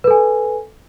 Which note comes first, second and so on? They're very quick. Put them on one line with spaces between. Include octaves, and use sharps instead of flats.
B4 A4 G#5